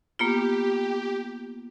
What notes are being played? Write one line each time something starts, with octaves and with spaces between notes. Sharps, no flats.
A#3 B3 F4 G4